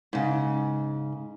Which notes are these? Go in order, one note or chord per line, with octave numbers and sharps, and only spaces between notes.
G#2 C#3